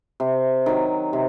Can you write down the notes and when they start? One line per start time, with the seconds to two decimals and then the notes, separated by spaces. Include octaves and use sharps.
0.20 C3
0.66 D#3 F#3
1.13 C3